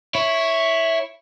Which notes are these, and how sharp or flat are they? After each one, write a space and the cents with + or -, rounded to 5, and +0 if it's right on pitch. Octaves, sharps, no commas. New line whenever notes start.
E4 +0 C#5 +0